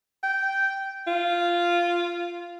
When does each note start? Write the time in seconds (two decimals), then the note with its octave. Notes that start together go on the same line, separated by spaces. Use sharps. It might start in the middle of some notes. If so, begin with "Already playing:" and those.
0.24 G5
1.07 F4